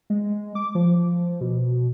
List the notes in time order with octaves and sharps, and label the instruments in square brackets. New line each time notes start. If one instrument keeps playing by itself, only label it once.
[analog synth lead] G#3
D6
F3
B2